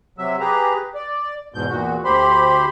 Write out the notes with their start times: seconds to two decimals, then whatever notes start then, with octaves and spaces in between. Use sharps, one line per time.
0.18 C3 F#3 E5
0.40 G4 G#4 B4 A#5
0.95 D5
1.54 E2 G#2 B2 G6
1.70 E2 A#2 F#4
2.04 D2 G4 C5 B5 C6